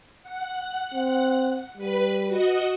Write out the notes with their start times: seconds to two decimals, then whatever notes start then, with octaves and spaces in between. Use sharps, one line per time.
0.23 F#5
0.94 C4
1.78 G3 B4
2.27 F#4 D#5